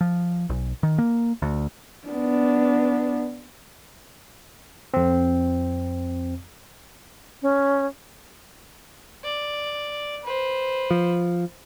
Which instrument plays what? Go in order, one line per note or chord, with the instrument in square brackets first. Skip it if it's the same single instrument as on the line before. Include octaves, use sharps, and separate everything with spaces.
[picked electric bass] F3
B1
D#3
A#3
D2
[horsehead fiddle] B3 D4
[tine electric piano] F2 C4
[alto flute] C#4
[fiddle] D5
B4 C5
[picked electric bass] F3